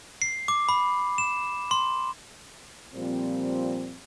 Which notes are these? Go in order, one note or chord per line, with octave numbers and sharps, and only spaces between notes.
C7
D6
B5
E7
C6
A#2 F3 G3 C4